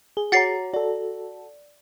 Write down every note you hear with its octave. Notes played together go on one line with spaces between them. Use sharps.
G#4 G7
F#4 C#5 F#5 A#5 A6 C7
F#4 A4 D5